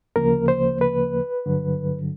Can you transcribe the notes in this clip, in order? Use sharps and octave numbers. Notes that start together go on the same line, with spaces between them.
D2 C#3 F3 A#3 A#4
C5
B4
G2 D3 F#3